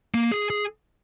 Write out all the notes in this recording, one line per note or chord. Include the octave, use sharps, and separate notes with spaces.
A#3
G#4
G#4